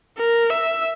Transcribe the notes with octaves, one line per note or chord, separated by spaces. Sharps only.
A#4
E5